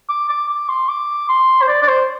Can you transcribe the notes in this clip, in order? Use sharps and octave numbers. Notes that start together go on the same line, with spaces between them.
D6
D6
D6
C6
D6
C6
C5
D5
D5
C5